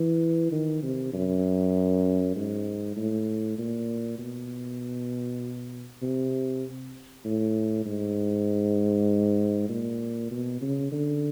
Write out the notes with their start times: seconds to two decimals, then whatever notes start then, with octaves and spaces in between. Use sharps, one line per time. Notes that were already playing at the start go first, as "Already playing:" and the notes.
Already playing: E3
0.52 D#3
0.83 C3
1.13 F#2
2.36 G#2
2.96 A2
3.58 A#2
4.19 B2
6.02 C3
7.25 A2
7.85 G#2
9.69 A#2
10.31 B2
10.61 C#3
10.92 D3